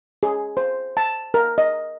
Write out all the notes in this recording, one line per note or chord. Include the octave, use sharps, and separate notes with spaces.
G#4
C5
A5
A#4
D#5